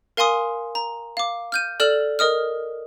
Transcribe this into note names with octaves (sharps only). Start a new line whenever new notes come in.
A#4 F5 G#5 C6 D#6
A#5
F5 D6
F6 G6 D#7
A4 D5 F6 E7 F#7
A#4 D#5 D#6 F6